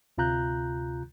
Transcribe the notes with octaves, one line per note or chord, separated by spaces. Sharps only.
D2 C3 F4 A#5 F#6 G6